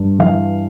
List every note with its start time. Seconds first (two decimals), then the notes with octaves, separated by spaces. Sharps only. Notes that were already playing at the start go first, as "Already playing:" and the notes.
Already playing: G2
0.19 E3 F5